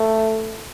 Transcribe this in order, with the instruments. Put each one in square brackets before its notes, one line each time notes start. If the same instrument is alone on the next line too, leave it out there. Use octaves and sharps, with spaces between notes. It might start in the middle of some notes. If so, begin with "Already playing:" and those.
Already playing: [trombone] A3